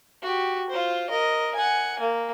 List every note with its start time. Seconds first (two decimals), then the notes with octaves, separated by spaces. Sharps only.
0.22 F#4 G4
0.70 F4 C5
1.10 A#4 D#5
1.55 F#5 G#5
2.00 A#3